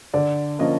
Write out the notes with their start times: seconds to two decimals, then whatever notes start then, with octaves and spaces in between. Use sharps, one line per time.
0.14 D3 D5
0.59 F3 A#3 C#4 D#5